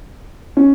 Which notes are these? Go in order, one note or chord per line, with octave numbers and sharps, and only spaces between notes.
C#4